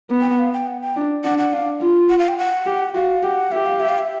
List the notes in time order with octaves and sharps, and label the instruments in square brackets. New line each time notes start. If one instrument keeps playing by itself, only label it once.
[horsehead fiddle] B3
[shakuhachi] G5
F#5
F5
G5
F#5
G5
[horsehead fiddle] D4
[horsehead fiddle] D4 [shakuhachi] F#5
[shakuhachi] F#5
[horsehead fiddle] D4 [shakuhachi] F5
[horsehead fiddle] F4
[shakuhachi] F#5
F5
G5
F#5
[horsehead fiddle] G4
[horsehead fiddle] F#4 [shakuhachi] F5
[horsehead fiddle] G4 [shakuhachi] F#5
[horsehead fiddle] G4 [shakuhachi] E5
[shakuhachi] F5
E5
F5
E5